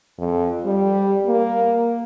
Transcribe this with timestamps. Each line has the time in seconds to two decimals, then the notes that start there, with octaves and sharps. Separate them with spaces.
0.18 F2
0.65 G3
1.27 A#3